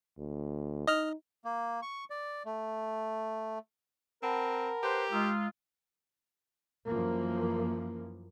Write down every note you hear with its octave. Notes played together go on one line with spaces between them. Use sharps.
D2
D#4 D#5 F6
A#3
C#6
D5
A3
C4 A#4 F#5 A5 B5
G4 B4 C5
G#3 F4 A#5 D#6 E6
F#2 E3 F3 A#3